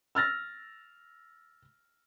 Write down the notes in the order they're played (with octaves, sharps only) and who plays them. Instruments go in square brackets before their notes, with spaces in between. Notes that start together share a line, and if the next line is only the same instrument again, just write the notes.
[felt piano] E6 F6 A6 A#6